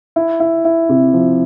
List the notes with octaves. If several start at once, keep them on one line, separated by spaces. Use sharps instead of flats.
E4
E4
E4
C3
F3